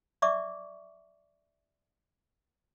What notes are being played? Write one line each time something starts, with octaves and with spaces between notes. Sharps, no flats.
D5 E5 C#6 D6